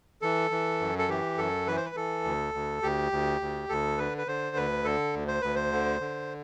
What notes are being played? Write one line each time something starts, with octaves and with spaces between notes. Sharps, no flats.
E3 A4
E3
F#2
A4
E3 G4
F#2 A4
E3 B4
C5
B4
E3 A4
D2
D2
D2 G4
D2
D2
D2 A4
D3 B4
B4
D3 C5
D2 B4
D3 A4
D2
C5
D2 B4
C5
D3
D3